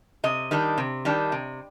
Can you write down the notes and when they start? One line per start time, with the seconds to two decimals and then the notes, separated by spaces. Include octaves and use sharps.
0.24 C3 D#5
0.51 D#3 G3 D4
0.78 C3
1.05 D#3 G3 D4
1.32 C3